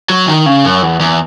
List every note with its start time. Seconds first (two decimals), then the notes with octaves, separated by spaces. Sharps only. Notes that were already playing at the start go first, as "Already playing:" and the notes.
0.10 F#3
0.27 D#3
0.46 C#3
0.65 F#2
0.82 E2
1.00 E2